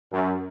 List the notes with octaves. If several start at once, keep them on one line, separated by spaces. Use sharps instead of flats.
F#2